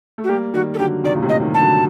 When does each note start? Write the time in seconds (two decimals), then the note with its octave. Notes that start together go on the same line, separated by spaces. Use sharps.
0.18 A3
0.24 F#4
0.29 G3 A#3 G4
0.54 D#3 G3 F#4
0.74 A4
0.78 D3 F#3 G4
1.04 C3 D#3 D5
1.15 A#2
1.22 A2 C3
1.29 D#5
1.41 D#3 G3
1.54 A5
1.60 D3 F#3